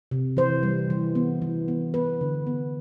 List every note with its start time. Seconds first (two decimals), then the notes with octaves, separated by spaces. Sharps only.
0.11 C3
0.37 E3 C5
0.63 G3
0.90 E3
1.15 B3
1.42 E3
1.68 B3
1.94 B3 B4
2.21 D3
2.47 B3